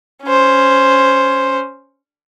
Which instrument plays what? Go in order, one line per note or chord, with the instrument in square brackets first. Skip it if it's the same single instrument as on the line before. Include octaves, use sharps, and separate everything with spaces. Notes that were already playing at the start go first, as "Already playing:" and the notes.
[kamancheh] C#4 C5